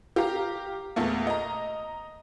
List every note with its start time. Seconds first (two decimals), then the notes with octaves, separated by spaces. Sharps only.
0.16 G4 F5 A#5
0.96 E2 A#2 A3 A#3
1.27 D#5 A#5